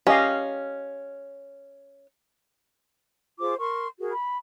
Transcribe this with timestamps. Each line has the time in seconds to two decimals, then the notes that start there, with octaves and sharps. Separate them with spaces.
0.07 C#4 G4 D#5 F5
3.39 F4 G#4 C5 D6
3.58 A#4 C6 C#6
3.99 F#4 G#4 A#4
4.12 B5